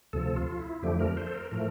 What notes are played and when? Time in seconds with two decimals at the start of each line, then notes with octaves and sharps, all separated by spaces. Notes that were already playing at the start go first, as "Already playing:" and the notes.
0.13 D2 C3 F3 A4
0.36 F4
0.59 E4
0.82 F2 D3 F3 A3 G4
0.99 A#4
1.17 C5
1.27 A4
1.34 A#4
1.51 A2 F3 A3 A#4